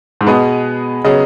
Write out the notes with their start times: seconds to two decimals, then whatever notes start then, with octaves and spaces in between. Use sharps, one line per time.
0.21 G#2
0.26 B2 G#3 B3 G#4 B4 D#5
1.04 C#3 F#3 B3 G#4 D#5